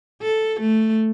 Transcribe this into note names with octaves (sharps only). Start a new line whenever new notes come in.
A4
A3